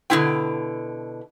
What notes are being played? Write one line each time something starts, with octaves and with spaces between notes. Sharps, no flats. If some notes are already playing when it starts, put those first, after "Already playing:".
B2 D3 B3 E4 G5